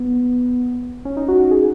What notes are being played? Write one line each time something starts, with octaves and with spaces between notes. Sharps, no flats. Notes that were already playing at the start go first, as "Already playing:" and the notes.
Already playing: B3
C#4
D#4
F#4
F#4
G#4